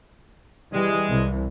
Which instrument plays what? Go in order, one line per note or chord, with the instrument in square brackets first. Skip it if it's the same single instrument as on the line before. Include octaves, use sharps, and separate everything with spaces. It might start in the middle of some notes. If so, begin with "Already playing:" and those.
[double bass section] E3 G3 [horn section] G#3
[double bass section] C2 E3